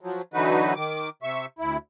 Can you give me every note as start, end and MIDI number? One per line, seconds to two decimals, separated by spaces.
0.01 0.22 53
0.01 0.22 54
0.34 0.74 50
0.34 0.74 52
0.34 0.74 54
0.34 0.74 63
0.34 0.74 66
0.34 0.74 71
0.75 1.09 51
0.75 1.09 86
1.23 1.46 48
1.23 1.46 76
1.23 1.46 85
1.59 1.77 38
1.59 1.77 64